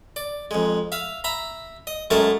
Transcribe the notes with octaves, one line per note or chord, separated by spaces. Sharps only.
D5
F2 G#3
E5 F5
E5 A#5 B5
D#5
F#2 G#3 A3 A#4 A5